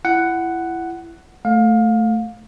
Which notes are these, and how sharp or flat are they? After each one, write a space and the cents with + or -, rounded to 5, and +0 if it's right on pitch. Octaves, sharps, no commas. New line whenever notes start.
E4 +25 F#5 +5
A3 +0 F5 +25